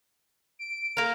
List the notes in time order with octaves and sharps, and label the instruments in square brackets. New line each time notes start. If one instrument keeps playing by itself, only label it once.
[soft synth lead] D7
[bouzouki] A#3 A#4